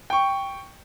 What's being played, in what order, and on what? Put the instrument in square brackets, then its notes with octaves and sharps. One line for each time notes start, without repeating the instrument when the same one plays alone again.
[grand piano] G5 C#6